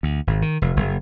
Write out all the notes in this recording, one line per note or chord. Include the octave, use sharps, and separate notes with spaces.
D2
G#1
D#3
F1
F#1